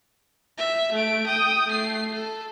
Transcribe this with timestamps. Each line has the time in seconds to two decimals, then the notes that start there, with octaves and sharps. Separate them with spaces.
0.58 E5
0.93 A3 D7
1.27 G5 D#6
1.67 A3 C7
2.13 A4